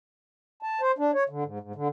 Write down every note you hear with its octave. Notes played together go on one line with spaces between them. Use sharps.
A5
C5
D4
C#5
D3
G#2
G#2
D3